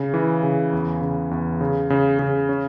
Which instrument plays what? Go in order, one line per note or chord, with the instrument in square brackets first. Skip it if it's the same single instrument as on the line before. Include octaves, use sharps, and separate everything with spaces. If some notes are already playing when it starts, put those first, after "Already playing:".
Already playing: [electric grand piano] C#3
E3
C#3
E2
C#3
E2
C#3
C#3
C#3
C#4